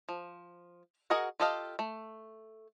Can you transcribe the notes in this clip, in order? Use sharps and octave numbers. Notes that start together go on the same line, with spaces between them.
F3
F#4 G#4 A#4 D#5 F#5
F4 G4 A4 D#5 F5
A3